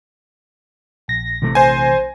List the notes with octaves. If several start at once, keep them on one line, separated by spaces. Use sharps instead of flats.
A#1 A#6
C3 E3 A3
C5 G#5